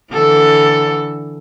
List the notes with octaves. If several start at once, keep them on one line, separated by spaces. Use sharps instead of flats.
D3 E3 A4